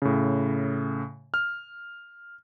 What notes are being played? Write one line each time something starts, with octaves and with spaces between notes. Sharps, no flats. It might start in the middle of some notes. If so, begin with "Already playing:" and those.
A2 C#3
F6